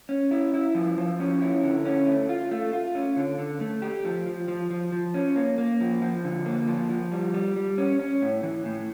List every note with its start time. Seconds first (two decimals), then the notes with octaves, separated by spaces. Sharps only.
0.09 C#4
0.31 E4
0.54 E4
0.75 F3
0.97 F3
1.20 C#4
1.41 E4
1.63 D3
1.85 C#4
2.07 A3
2.29 F4
2.51 A3
2.73 F4
2.95 C#4
3.17 D3
3.39 D3
3.61 A3
3.82 G4
4.05 F3
4.27 F3
4.48 F3
4.71 F3
4.92 F3
5.14 C#4
5.36 A#3
5.58 A#3
5.81 F3
6.02 F3
6.24 D3
6.46 A#3
6.67 F3
6.90 F3
7.12 G3
7.34 G3
7.56 G3
7.78 C#4
8.00 C#4
8.22 A2
8.43 E3
8.65 A2